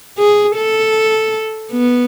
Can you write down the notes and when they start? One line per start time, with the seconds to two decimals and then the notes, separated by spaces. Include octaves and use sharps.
0.19 G#4
0.56 A4
1.72 B3